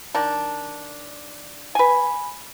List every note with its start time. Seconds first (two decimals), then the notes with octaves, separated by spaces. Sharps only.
0.15 D#3 D4
1.75 B4 G#5